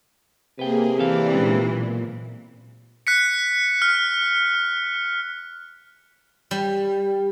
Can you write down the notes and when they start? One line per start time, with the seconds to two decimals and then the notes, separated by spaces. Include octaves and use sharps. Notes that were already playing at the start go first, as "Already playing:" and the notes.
0.59 C3 A#3 G#4 B4 G5
0.98 E3 C4 A4 D5 F5
1.34 A#2 G#3 C#4 D4
1.69 B1
3.07 F#6 B6 C#7
3.82 F6
6.51 G3